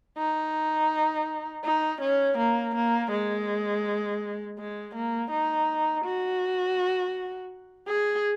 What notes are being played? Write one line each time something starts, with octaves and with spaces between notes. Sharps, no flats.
D#4
D#4
C#4
A#3
A#3
G#3
G#3
A#3
D#4
F#4
G#4